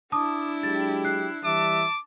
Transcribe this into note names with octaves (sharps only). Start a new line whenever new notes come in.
D4 E4 A5 D6 D#6
F#3 G#3 G4 A6
F#6 C7
E3 G3 E5 A5 D6